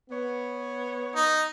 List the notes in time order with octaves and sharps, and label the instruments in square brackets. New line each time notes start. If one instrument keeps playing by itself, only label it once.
[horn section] B3 C#5
[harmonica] D#4